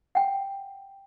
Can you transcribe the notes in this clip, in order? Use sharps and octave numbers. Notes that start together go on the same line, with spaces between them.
F#5 G5